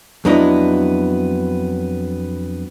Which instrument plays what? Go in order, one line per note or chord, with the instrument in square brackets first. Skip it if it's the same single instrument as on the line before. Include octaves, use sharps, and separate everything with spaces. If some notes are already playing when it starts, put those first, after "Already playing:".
[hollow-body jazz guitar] F2 F#3 B3 D4 E4 D#5